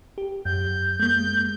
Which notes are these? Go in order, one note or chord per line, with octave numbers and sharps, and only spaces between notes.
G4
F#2 G6
G#3 A#3 G6